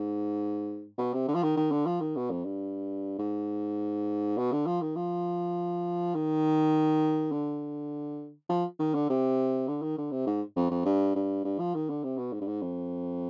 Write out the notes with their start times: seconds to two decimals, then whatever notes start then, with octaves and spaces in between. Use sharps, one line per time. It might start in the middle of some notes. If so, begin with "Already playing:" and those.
Already playing: G#2
0.98 B2
1.13 C3
1.28 D3
1.35 F3
1.43 D#3
1.57 D#3
1.71 D3
1.86 F3
2.00 D#3
2.16 B2
2.30 F2
2.45 G2
3.19 G#2
4.37 B2
4.52 D3
4.66 F3
4.81 D#3
4.96 F3
6.14 D#3
7.32 D3
8.49 F3
8.79 D#3
8.94 D3
9.09 C3
9.68 D3
9.82 D#3
9.98 D3
10.11 C3
10.26 G#2
10.56 F2
10.71 F2
10.85 G2
11.15 G2
11.44 G2
11.59 F3
11.74 D#3
11.89 D3
12.03 C3
12.18 B2
12.33 G#2
12.41 G2
12.47 G#2
12.62 F2